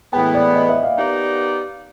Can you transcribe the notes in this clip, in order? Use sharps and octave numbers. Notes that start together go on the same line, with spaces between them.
A2 E3 G#3 B3 G5
D5
D#5
E5
F5
B3 D#4 G4 A#4 D5